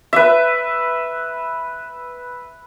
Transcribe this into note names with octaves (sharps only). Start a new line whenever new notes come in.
B4 E5